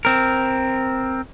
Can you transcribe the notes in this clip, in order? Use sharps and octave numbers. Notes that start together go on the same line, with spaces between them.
C4 A#4